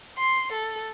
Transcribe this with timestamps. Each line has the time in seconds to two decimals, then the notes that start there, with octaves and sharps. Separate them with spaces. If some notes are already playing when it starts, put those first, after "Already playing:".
0.18 C6
0.53 A4